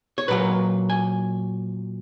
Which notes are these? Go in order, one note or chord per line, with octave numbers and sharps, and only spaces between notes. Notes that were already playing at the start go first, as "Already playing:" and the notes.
C#5
A#2 F#3 A#3 B4
G#5